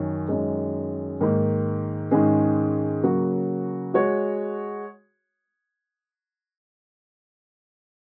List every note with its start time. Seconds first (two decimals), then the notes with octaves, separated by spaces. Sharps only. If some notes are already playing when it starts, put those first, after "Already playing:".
Already playing: F#2 D#3 C#4
0.28 F#2 D#3 G#3
1.20 G#2 D#3 A#3
2.11 G#2 D#3 G#3 C#4 G#4
3.03 C#3 F#3 A#3 F#4
3.94 G#3 F#4 C#5